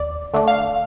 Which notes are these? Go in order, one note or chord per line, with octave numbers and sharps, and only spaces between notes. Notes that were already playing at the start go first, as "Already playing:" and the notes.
Already playing: D#2 D5
D3 A3 D4
F5